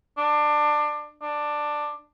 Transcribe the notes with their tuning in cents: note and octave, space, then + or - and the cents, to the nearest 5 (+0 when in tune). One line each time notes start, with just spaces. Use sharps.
D4 +20
D4 +10